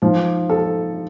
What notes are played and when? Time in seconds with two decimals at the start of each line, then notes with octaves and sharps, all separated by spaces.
0.02 F3 D#4
0.50 A4